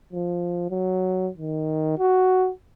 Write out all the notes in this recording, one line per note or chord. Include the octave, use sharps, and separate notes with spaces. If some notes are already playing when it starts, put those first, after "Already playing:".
F3
F#3
D#3
F#4